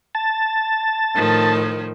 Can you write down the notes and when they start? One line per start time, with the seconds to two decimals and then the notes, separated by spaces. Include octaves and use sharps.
0.15 A5
1.15 A2 D#3 F3